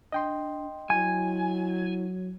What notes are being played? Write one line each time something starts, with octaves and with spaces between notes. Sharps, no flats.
D4 D#5 G5 C6
F#3 E4 G#5